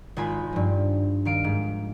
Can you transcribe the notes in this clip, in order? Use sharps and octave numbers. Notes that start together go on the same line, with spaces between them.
G#1 G#3 F4 G#5 B5
G2 F3
D#3 F5 D7
G#2